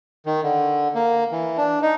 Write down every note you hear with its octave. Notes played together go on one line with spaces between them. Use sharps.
D#3
D3
A#3
E3
D4
D#4